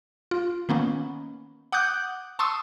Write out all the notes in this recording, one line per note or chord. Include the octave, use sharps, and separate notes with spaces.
F4
D#3 A#3 B3 C#4
F#5 D6 D#6 F#6 G6
A5 C6 C#6 D#6 E6